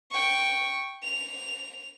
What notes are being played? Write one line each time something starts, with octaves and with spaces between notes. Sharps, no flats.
G5 C#6
F7